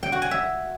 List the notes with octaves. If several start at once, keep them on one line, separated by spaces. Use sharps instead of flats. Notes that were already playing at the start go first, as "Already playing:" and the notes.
G5
F#4
G#5
E5